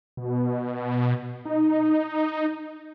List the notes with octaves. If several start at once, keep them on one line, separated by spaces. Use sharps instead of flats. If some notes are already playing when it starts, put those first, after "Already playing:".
B2
D#4